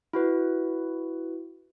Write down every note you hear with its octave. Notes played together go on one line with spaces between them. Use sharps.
E4 F#4 B4